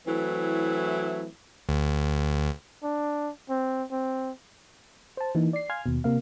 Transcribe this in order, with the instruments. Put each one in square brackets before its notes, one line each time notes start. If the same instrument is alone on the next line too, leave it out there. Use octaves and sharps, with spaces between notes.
[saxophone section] E3 F#3 A3 C4 E4
[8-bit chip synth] D2
[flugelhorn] D4
C4
C4
[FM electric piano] C5 A5
E3 A#3 D#4
D5 C7
F5 G#5 C6 F6 G#6
D#2 B2
C3 A#3 F5